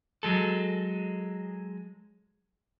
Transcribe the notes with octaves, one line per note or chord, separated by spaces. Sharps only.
F#3 G#3 A4